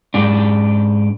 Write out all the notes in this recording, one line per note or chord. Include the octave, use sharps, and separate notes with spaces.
G#2 D4